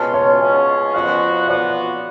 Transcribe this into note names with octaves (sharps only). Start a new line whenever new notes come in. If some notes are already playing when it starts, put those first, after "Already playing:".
Already playing: B2 G#3 C#4 F4 A5
C#5
B2 G#3 C#4 F4
F2 F3 B3 F#4
F3 B3 F#4 D5